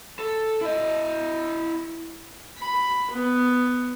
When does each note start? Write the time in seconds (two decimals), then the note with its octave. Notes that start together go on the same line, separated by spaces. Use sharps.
0.19 A4
0.61 E4 D#5
2.59 B5
3.12 B3